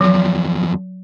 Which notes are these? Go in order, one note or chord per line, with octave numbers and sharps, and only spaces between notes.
E2 F3 F#3